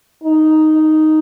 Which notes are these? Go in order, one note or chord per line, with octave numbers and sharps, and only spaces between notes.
D#4